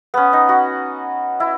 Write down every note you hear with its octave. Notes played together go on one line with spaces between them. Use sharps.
B3 C#4
D#4
F#4
E4